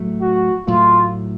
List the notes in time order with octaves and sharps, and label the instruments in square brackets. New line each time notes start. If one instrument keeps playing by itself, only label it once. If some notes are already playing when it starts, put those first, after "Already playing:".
Already playing: [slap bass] A2 F#3 A3
[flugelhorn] F#4
[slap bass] A2 F#3 A3 [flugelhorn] F4